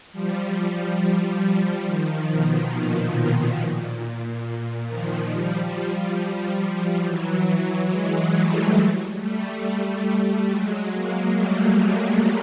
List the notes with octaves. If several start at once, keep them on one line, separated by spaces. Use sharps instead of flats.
F3 G3
F3 G3
D#3 F3
B2
A#2
A#2
D#3 F3
F3 G3
E3 F#3
E3 F#3
F#3 G#3
G3 A3
G3 A3
G3 A3
G3 A3
F#3 G#3
G#3 A#3
G3 A3
F#3 G#3